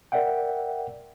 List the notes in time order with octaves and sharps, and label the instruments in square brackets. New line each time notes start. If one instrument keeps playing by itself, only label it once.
[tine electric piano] A#4 D5 E5 F#5 G5